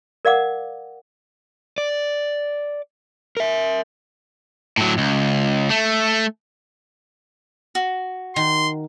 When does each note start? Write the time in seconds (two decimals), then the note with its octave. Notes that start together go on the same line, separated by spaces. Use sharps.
0.25 A#4 D5 F5 F#5 D6
1.78 D5
3.37 A#4 E5
4.77 A2 F#3
4.98 C#2
5.70 A3
7.75 F#4
8.36 D#3 C6